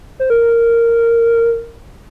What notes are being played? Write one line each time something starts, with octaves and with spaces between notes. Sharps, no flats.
C5
A#4